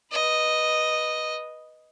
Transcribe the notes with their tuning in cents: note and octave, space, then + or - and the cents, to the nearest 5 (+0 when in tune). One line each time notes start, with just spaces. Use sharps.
B4 -15 D#5 +0